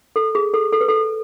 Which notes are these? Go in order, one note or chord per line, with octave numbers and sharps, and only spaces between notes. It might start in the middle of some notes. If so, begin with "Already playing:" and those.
A4
G#4
A4
A4
B4
A4